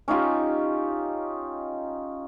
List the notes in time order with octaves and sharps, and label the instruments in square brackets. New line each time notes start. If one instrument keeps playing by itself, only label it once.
[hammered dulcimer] C#4 D#4 F4 G4